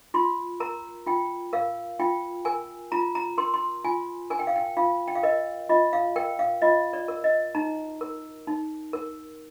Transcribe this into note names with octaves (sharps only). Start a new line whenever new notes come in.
F4 C6
A#4 A#5
F4 G5
A#4 F5
F4 G5
A#4 G#5
F4 A#5
A#5
A#4 C6
C6
F4 G#5
A#4 G#5
G5
F5
G5
F4 F5
G5
F5
A#4 D#5
F4 D#5
F5
A#4 G5
F5
F4 D#5
D5
A#4
D#5
D#4 A#5
A#4
D#4
A#4